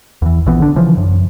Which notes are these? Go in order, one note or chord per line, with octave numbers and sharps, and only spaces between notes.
E2 E3
A#1 E3 B3
D3 D4
C#3 E3 F3
F#2